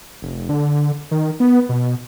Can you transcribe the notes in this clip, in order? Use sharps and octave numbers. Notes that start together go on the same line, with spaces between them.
F1
D3
D#3
B3
B2